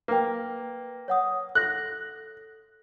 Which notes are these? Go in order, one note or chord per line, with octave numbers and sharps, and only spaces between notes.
A#3 B4 G5
C#5 F#5 D#6
A4 F#6 A#6